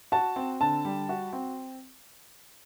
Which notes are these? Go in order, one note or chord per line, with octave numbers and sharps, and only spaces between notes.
F#4 A5
C4
D3 A5
G3
F#4
C4